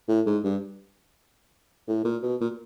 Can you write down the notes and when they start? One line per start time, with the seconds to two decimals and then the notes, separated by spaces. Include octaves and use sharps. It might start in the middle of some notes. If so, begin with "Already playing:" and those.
0.08 A2
0.26 G#2
0.44 G2
1.88 A2
2.05 A#2
2.23 B2
2.41 A#2